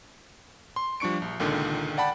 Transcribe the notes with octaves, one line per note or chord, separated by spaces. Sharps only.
C6
F3 G3 D4 C#6 C#7 D7
A#1
C#2 A#2 D3 D#3
D5 F#5 G5 A5 B5